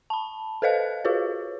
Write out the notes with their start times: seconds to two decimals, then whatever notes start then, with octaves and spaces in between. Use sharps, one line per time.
0.10 A5 B5
0.62 A4 B4 C5 D#5 F5 F#6
1.05 F4 F#4 G#4 B4 C#5